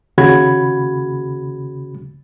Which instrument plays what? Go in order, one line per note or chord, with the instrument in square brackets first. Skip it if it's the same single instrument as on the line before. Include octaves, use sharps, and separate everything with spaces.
[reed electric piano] D#2 C#3 F#4 B5 G#6